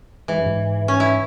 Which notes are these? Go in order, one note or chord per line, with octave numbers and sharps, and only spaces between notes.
G#2 E3
F#2
G#2
C#4
E4